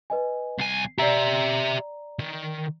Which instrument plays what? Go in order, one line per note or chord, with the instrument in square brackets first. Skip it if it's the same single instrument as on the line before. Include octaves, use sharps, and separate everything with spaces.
[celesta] B4 D#5 G#5
[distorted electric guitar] C2 G#5 [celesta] C7
[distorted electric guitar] G4 E5 [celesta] D5 A#5
[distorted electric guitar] D#3